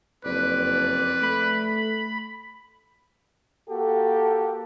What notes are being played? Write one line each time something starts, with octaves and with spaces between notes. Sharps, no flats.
F#1 F2 B4 D5
A3 B5
A#3 F#4 G4 A4